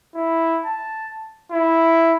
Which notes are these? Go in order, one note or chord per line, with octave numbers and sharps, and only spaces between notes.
E4
A5
E4